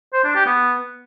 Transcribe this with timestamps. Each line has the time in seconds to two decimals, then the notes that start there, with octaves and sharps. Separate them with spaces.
0.13 C5
0.24 D4
0.35 G4
0.46 B3